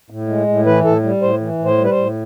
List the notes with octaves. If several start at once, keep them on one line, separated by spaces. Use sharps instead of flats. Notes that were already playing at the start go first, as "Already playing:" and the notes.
A2
G#3
A2
E3 B4
A2 A4
G3
A2 C5
E3
A2
C5
G3
B4
C5
A2